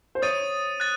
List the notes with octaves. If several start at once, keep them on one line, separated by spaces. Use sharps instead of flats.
C5
C#5 D#6 A6 D#7
F#6 A6